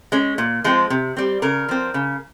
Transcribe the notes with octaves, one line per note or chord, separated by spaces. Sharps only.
G#3 C#4
A#2
F3 G#3 C4
C3
G3 C4
C#3 A#4
F3 C4
C#3